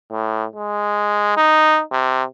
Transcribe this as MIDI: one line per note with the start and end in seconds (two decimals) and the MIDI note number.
0.11 0.44 45
0.56 1.37 56
1.37 1.81 63
1.92 2.23 48